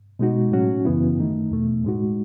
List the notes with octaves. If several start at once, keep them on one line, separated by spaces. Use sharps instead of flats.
B2 G#3 D#4 F#4
A2 F#3 C#4 F#4
F#2 C#3 E3 B3 E4
D#3 A3 D#4
E2 B2 A3
A2 G#3 D#4 F#4